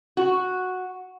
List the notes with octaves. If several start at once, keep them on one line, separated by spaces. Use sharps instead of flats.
F#4